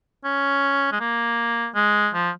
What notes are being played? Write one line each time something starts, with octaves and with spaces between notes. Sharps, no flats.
C#4
G#3
A#3
G#3
F3